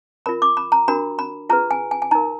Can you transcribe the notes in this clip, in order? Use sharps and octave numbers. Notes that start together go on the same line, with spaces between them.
F4 A#4 B5
D6
B5
A#5
D4 F#4 A#4 B5
B5
F4 G#4 B4 A#5
G#5
G#5
G#5
D#4 A#4 A#5